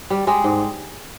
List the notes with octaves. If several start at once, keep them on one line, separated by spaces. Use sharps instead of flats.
G3
G3 G#3
G#2